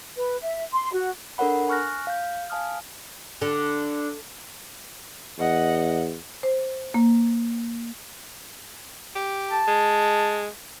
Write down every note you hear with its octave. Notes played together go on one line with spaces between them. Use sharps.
B4
E5
C6
F#4
D4 A4 A#4 C#5 F#5 B5
G#5 C#6 F6 F#6 A#6
F5 G6
F5 G#5 A5 D#6 F6
D3
E2 D#5 F#5
C5
A#3
G4
A5
G#3